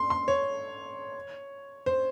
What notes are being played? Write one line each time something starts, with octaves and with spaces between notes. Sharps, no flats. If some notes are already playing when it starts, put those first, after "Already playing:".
Already playing: C6
C6
C#5
C5